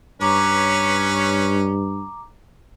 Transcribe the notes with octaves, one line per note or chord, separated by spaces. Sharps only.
G2 C#4 B4 C#5 A#5 D6